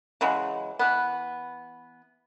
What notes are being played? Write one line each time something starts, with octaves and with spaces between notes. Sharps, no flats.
C#3 E3 F#3 G#3
E3 B3